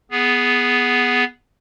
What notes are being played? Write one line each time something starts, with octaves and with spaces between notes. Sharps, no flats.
B3 G#4